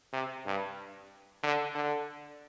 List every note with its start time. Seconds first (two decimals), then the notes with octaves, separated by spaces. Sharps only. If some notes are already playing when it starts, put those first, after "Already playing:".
0.13 C3
0.46 G2
1.43 D3
1.75 D3